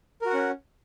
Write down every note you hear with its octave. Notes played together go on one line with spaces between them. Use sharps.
C#4 F#4 A#4 F#5